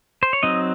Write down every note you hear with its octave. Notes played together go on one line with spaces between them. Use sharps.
C5
C#5
F#3 C4 D#4 D#5